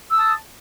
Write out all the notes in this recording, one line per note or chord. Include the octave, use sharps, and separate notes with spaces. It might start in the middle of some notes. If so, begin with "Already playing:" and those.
A5 D#6 E6